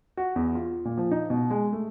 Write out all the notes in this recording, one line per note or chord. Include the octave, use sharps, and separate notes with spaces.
F#4
E2
F4
A#2
F3
D#4
B2
G#3
A3